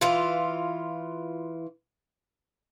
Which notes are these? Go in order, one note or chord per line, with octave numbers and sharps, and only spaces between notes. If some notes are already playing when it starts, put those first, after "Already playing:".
E3 F4